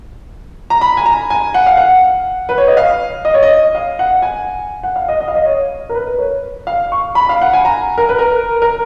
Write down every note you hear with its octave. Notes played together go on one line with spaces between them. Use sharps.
A#5
B5
G#5
A#5
G#5
F#5
F5
F#5
B4
C#5
D#5
F5
D#5
C#5
D#5
F5
F#5
G#5
F#5
F5
D#5
D#5
F5
D#5
C#5
A#4
B4
C#5
F5
C#6
B5
F5
F#5
G#5
A#5
A#4
B4
A#4
A#4